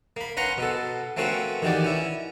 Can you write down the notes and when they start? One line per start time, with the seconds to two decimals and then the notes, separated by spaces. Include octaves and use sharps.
0.17 A#3 B5
0.37 C#4 B4 F#5 A#5 C6
0.58 B2 B3 A4
1.17 A3 A#3 C4 C#4 F#4 B4
1.62 D#3 E3 F#4 G4 D5
1.84 C#4 E4